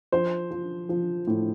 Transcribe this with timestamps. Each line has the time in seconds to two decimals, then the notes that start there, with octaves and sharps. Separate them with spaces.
0.12 F3 C5
0.51 F3
0.89 F3
1.27 A2